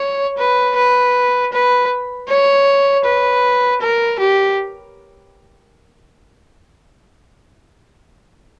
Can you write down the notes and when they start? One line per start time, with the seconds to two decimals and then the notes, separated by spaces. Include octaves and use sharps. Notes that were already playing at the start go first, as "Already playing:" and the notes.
Already playing: C#5
0.38 B4
0.76 B4
1.53 B4
2.28 C#5
3.05 B4
3.81 A#4
4.19 G4